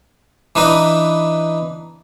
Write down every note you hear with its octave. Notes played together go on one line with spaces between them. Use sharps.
E3 D4 D#4 B4 D#5